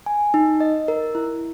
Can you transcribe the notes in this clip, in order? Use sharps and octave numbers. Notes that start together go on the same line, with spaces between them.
G#5
D#4
D#5
A#4
E4